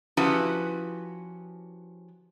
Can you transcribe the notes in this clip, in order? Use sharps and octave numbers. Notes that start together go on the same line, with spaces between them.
F3 C#4 E4 F#4 G4 B4